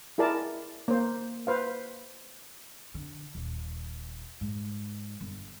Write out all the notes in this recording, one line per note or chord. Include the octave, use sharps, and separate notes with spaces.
E4 G#4 A#4 D5 A5
A#3 C5
B4 C5 F5
D3
D#1
G#2
G1